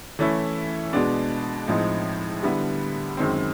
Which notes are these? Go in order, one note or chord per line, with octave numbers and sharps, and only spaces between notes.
E3 A3 C#4 E4
B2 G#3 B3 D4
A2 F3 G#3 C4 D#4
D3 G3 B3 E4
F#2 D#3 G#3 C4